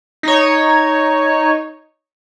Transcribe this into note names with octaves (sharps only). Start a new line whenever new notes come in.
D#4 C#5